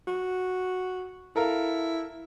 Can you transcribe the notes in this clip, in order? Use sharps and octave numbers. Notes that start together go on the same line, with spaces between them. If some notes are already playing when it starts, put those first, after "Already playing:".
F#4
E4 A4 A#4 F5